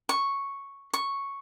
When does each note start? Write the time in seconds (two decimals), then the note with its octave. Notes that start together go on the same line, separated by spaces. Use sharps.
0.09 C#6
0.94 C#6